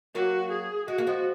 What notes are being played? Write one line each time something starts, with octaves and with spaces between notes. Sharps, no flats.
F#3 A#3 F#4
G#4
G#3 F#4
A#3
F3 G#3